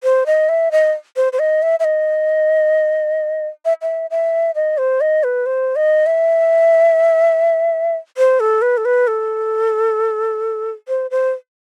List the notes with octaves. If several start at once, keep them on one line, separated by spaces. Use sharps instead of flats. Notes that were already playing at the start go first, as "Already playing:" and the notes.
C5
D#5
E5
D#5
C5
C5
D#5
E5
E5
D#5
E5
E5
E5
D#5
C5
D#5
B4
C5
D#5
E5
C5
A4
B4
A4
B4
A4
C5
C5